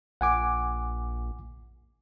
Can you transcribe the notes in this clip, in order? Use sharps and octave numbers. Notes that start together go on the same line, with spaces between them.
A#1 F#5 G#5 D6